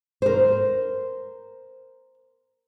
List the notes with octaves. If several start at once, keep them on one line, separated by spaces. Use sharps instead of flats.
A#4 C5